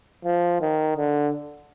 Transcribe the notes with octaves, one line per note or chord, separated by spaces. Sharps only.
F3
D#3
D3